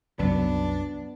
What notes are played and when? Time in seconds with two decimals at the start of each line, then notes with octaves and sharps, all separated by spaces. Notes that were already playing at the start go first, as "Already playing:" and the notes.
0.19 C2 F#2 F#3 B3 D4